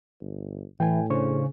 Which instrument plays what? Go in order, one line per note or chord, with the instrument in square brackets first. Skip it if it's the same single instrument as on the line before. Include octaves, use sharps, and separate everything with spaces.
[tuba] G1
[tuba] A2 [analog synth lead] E3 [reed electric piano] G5 G#5
[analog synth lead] C#3 [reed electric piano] D4 C5 C#6